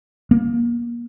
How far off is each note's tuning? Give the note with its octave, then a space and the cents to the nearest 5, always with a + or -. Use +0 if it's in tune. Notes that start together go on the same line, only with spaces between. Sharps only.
A#3 +30